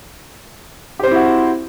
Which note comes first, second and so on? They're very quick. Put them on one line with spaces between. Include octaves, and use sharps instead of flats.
G4 C5 C4 E4 F#4